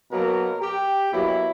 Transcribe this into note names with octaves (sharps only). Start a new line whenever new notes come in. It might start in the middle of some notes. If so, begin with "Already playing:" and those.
B2 F#3 A#3 A#4
G4
B2 F#3 A#3 E4